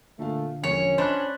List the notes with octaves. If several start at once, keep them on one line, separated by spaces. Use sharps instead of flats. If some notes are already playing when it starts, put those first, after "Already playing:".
A#2 D3 A3 F5
E1 A#1 C#4 C#5
D4 C5 D#5 B5 F#6